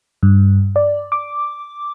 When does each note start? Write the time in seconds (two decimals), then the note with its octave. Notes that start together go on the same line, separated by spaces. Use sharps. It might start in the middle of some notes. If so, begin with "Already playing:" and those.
0.23 G2
0.76 D5
1.12 D6